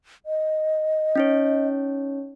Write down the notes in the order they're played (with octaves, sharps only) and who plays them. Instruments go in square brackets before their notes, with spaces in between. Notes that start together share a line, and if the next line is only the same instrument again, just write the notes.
[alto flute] D#5
[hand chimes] C#4 D#4 C#5